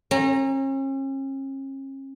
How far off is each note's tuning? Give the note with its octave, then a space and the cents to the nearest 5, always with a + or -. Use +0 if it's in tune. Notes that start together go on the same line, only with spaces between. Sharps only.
C#4 -40 A#5 +0